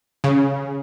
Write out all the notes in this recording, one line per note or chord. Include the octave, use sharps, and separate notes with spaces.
C#3